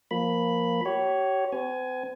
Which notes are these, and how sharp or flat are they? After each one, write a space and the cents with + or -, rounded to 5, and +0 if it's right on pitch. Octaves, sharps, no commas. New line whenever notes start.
F3 +0 A#3 +10 B5 +0
G4 -40 C#5 +0
C4 -45 G#5 +15